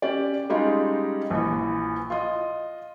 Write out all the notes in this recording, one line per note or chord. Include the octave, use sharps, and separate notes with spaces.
C#4 G4 D5
G3 G#3 C#4 D#4 F4 G4
A#1 E3
F4 D#5